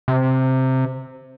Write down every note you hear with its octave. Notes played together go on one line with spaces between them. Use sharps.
C3